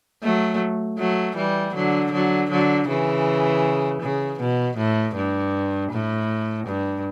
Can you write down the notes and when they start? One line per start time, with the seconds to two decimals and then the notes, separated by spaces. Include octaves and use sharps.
0.23 F#3 A3
0.98 F#3 A3
1.36 E3 G3
1.74 D3 F#3
2.12 D3 F#3
2.50 D3 F#3
2.88 C#3 E3
4.01 C#3
4.40 B2
4.77 A2
5.15 G2
5.91 A2
6.67 G2